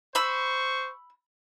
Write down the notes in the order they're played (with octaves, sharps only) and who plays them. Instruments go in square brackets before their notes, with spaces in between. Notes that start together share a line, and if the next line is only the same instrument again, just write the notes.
[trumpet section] C5 C#6 [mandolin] B5 E6